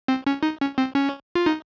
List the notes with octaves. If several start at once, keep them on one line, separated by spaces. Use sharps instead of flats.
C4
C#4
D#4
C#4
C4
C#4
F4
D#4